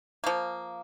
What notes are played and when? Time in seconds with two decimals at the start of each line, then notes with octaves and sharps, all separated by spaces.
0.24 F3 A#3